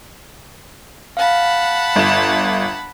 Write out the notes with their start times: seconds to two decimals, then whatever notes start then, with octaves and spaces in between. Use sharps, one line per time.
1.17 F5 F#5 A5 B5
1.96 G1 E7